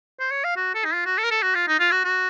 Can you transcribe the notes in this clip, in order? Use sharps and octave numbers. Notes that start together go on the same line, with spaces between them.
C5
C#5
F5
F#4
A4
D#4
F4
F#4
A4
A#4
A4
F#4
F4
D#4
F4
F#4
F#4